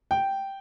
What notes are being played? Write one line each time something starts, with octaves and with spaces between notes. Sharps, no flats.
G5